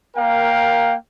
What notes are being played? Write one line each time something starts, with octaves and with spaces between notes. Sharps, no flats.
A#3 A#4 F5 G5